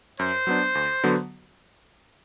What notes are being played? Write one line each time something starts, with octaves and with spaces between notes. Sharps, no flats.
F#2 C5
F#3 B3 D4
D2
D3 F#3 B3 F#4